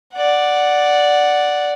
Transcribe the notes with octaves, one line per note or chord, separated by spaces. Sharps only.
D5 F#5